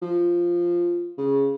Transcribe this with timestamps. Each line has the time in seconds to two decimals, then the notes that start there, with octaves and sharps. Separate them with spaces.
0.02 F3
1.18 C#3